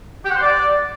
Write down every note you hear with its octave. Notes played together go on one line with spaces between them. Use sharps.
G4
F#5
C5
D5